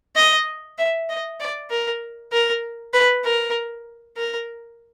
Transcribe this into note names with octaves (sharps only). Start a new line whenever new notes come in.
D#5
E5
D#5
D5
A#4
A#4
B4
A#4
A#4